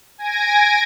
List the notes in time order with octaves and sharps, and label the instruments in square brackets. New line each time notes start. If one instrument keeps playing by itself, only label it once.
[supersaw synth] G#5 G#6 A#6 D7